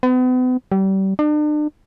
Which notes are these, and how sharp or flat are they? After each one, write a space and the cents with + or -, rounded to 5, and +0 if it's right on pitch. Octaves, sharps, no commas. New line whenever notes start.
B3 +40
G3 -30
D4 +40